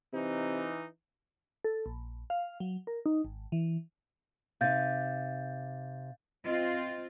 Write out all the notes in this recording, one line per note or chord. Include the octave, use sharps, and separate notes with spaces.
C3 E3 D#4
A4
A#1
F5
F#3
A#4
D#4
G#1
E3
C3 D#4 F5 G6 A6
C4 F4 D#5